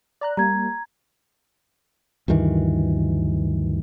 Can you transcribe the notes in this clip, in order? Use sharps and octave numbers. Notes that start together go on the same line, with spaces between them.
D5 A#5 F#6
G3 A#3 A#5 G#6
D2 G2 D#3 E3